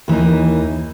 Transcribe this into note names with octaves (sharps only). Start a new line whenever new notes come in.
D#2 E3 A#3 D#4